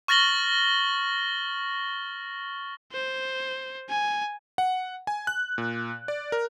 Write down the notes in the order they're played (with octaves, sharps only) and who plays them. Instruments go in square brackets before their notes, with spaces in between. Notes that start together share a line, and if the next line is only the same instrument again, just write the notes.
[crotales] C#6 F6 A6 A#6 F#7 G7
[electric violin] C5
G#5
[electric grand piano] F#5
G#5
F#6
A#2
D5
A#4